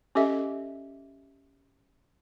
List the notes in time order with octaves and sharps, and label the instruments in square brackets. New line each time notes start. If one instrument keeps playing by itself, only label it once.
[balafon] C#4 G4 A4 D#5 E5